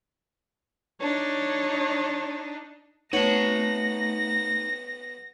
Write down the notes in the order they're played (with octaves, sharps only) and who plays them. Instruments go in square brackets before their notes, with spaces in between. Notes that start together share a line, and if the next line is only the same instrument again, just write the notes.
[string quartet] D4 D#4 [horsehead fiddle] C#5
[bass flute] A3 [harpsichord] B3 F#4 C#5 [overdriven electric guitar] D#4 A5 [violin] A#6